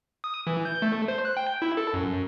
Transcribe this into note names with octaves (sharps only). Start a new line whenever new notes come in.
D#6
E3
G6
A3
C5
F#6
G5
E4
A4
F#2